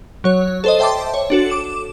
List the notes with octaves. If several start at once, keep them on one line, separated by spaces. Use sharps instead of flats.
F#3 C#5
A4 C5 D#5
C5 E5 G5 A5 C6 D6
C#5
D4 F#4 A4
D6 E7